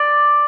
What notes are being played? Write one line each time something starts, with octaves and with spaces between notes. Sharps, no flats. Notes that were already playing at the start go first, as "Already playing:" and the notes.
Already playing: D5